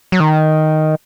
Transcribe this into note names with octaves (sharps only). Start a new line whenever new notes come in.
F#3
D#3